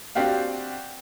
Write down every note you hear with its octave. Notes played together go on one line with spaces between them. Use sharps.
C4 D4 F#4 G4 F5